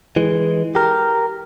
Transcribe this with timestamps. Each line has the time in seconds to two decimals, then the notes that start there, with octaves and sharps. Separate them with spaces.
0.16 E3 G#3
0.75 G4 A#4